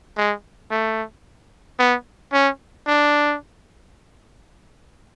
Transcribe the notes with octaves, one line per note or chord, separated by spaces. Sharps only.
G#3
A3
B3
C#4
D4